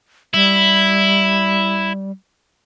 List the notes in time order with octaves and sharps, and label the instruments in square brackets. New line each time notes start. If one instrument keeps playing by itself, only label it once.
[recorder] G3 [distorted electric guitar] E4